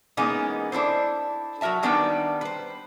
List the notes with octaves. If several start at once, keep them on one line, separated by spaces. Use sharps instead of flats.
E3 G#3 A#3 B3 C#4 D#4
D4 E4 A4 C5
F#3 F#4 A#4 E5 A5
D#3 G3 B3 D4 D#4 G5
B4 C5